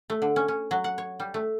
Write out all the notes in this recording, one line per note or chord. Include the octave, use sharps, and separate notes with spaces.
A3
D3
C#4
C#4
F#3
F#5
C#5
G3
A3